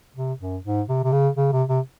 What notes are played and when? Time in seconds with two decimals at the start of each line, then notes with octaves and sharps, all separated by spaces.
0.16 C3
0.41 F#2
0.64 G#2
0.88 C3
1.04 C3
1.12 C#3
1.37 C#3
1.52 C3
1.69 C3